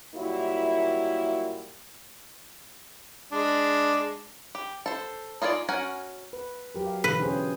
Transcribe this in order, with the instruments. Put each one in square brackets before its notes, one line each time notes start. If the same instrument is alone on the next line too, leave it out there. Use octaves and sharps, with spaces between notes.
[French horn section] A#2 F#3 G3 A#3 E4
[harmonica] G#3 D4
[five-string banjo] G4
A4 C5
D#4 F4 G#4 C#5 D5
C#4 F#4 A#4 F#5 G#5
[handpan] B4
F#3 G4 A#4
F5
[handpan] B2 D3 E3 [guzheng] B4
[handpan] C#4 G#4 C5